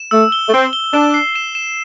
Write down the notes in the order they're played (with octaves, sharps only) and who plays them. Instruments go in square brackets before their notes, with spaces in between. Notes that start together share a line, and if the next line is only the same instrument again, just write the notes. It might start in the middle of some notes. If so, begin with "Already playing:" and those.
Already playing: [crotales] E7
[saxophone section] A3 [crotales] E6
[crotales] G7
[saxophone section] A3
[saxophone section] C4 [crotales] G7
[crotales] G7
[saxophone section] D4 [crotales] E7
[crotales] C7
E7
E7